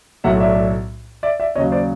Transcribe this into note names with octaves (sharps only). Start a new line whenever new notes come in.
B1 A2 F#3 E5 F#5
D5 E5
D5 E5
D5 E5
D#2 C#3 F#3 C#5 D#5
C5 D5